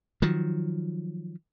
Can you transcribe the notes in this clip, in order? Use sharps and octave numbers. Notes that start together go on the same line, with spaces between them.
D#3 F3 F#3